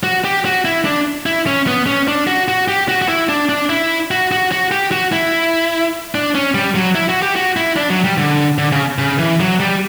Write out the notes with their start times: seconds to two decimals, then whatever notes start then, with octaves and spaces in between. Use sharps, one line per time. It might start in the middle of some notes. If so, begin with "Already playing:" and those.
0.03 F#4
0.24 G4
0.45 F#4
0.65 E4
0.85 D4
1.26 E4
1.47 C#4
1.67 B3
1.86 C#4
2.08 D4
2.27 F#4
2.48 F#4
2.68 G4
2.89 F#4
3.02 F#4
3.08 E4
3.29 D4
3.49 D4
3.69 E4
4.11 F#4
4.32 F#4
4.52 F#4
4.71 G4
4.91 F#4
5.12 E4
6.15 D4
6.35 C#4
6.54 G3
6.75 F#3
6.95 E4
7.09 F#4
7.22 G4
7.36 F#4
7.57 E4
7.76 D4
7.90 F#3
8.04 G3
8.18 D3
8.58 D3
8.72 C#3
8.98 C#3
9.19 E3
9.40 F#3
9.60 G3